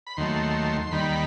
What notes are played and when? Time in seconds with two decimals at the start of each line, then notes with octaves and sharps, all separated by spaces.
0.07 B5
0.17 D#2 D#3 F#3 A3 C6
0.81 C6
0.91 D#2 D#3 G3 B5